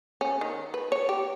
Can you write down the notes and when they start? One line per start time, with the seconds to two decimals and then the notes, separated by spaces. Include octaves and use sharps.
0.21 C#4
0.41 D#3
0.74 B4
0.92 C#5
1.09 G4